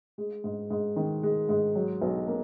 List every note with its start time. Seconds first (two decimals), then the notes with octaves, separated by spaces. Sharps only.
0.18 G#3
0.44 G#2
0.70 G#2
0.96 D#3
1.23 G#3
1.49 G#2
1.75 F#3
2.02 B1
2.28 A#3